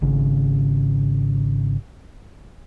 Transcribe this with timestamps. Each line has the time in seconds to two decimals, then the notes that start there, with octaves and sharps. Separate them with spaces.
0.02 G#1 C#3